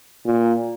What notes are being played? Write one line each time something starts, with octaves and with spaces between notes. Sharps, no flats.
A#2